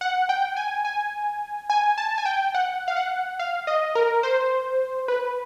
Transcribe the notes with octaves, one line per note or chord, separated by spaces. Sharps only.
F#5
G5
G#5
G#5
G#5
A5
G#5
G5
F#5
F5
F#5
F5
D#5
A#4
C5
B4